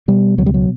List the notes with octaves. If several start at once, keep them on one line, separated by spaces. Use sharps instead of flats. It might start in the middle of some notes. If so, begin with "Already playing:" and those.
B2 G3
C#2 F#3
G3
F#3